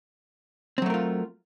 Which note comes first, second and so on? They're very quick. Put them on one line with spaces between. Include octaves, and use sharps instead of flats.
C4 F#3 A3 A#4 F4